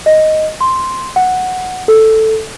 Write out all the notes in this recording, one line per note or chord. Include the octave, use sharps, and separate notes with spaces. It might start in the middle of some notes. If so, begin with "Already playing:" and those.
D#5
C6
F#5
A4